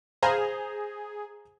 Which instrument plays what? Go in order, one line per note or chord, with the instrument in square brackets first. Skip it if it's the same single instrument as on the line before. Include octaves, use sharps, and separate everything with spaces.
[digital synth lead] G#4 [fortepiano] C5 F5 A#5